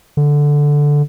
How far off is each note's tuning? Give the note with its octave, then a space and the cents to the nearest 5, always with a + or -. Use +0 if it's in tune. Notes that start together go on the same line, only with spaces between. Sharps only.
D3 -5